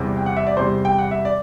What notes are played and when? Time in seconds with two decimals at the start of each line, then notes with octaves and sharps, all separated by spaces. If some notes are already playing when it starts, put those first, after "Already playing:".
Already playing: E2 C3 G3
0.17 G5
0.26 F#5
0.37 E5
0.47 D5
0.57 E2 C3 G3 C5
0.85 G5
0.98 F#5
1.11 E5
1.25 D5